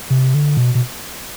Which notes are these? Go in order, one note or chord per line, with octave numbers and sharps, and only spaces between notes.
C3
D3
B2
B2